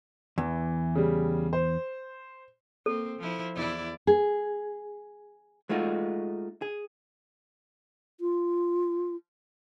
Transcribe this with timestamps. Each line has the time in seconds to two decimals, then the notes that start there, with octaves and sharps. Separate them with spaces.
0.38 E2 E3
0.95 C#3 G3
1.53 C5
2.86 A#3 C4 A4
3.19 F3 E4
3.55 E2 E4 D5
4.07 G#4
5.69 G#3 A3 D#4 F4 F#4
6.62 G#4
8.21 F4